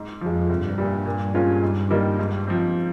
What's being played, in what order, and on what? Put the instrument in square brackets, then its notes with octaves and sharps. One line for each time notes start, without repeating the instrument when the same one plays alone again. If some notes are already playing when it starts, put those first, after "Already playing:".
Already playing: [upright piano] G#2
[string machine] F2 [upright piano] F3 G#3
[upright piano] C2 [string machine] G2
[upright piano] A#2 G3
A#2
G#3 C#4 F4 A#4
G#2
D#3 G3 A#3 D#4
G#2
F3 C4